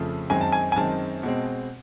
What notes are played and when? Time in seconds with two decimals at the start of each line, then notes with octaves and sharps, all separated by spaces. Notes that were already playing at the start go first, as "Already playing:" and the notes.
Already playing: F2 C#3 F3 A3
0.30 F#2 D#3 G#3 C4 G#5
0.41 A5
0.52 G#5
0.72 G#5
0.76 F#2 D#3 G#3 C4 A5
1.23 B2 G#3 C4